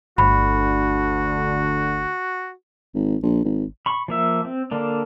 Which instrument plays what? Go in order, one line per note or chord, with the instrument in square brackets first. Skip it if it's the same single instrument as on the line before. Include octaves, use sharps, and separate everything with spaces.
[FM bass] G1 [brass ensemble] D2 D3 [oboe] F#4 [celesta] B5
[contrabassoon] G#1
A#1
G#1
[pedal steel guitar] B5 C#6
F3 A#3 E5
C4
D3 A#3 D4